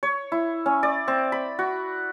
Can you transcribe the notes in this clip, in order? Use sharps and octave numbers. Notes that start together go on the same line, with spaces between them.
C#5
E4
C#4
D5
C4
B5
F#4